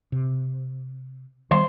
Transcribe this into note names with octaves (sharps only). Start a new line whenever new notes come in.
C3
D#3 G3 B3 C5